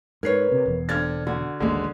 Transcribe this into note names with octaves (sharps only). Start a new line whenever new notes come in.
G#2 A#4 B4 C#5 G#6 C7
C3
E1 E2
D3 C4 D4 F6 G#6 A6
D3 F#4
A1 D#2 D3 G#3